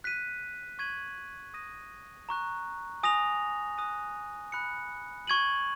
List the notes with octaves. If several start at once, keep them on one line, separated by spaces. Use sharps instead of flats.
F#6 B6 D#7
C#6 G#6 D#7 F#7
D#6 A#6 D#7
A#5 C#6 F#6
G#5 D#6 A#6 F7
D#6 F#6 A#6 D#7
B5 F#6 C#7
C#6 G#6 D#7 F#7